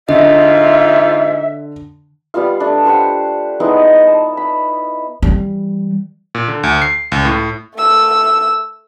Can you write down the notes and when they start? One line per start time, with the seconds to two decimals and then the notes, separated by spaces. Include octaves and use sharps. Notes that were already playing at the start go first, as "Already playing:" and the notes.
0.09 G#2 D3 F4 D#5 E5
2.34 G3 B3 F4 F5
2.60 A3 D4
2.85 G4 C5 F#5
3.60 G#3 B3 D#4 E4
4.07 A5
4.37 B5
5.22 E3 G3
6.35 A#2
6.48 D3
6.63 D2
6.82 C7
7.12 C#2
7.25 A2
7.75 A3 E6